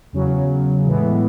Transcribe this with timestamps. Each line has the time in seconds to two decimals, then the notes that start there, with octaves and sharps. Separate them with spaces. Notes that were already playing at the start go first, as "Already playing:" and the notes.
0.13 E2 C#3 F#3
0.87 A2 E3 G#3 B3